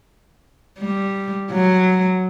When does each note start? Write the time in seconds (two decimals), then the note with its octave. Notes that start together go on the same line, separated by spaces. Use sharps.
0.79 G3
1.51 F#3